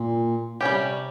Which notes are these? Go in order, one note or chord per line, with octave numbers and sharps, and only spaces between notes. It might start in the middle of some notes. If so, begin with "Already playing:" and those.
Already playing: A#2
C3 G3 C#4 G4